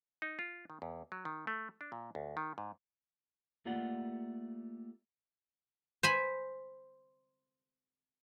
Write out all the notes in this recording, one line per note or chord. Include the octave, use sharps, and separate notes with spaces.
D#4
F4
D#3
E2
F#3
D#3
A3
D4
A#2
D2
D#3
G#2
A3 A#3 F4 G4 D5 F#5
C5 G#5 B5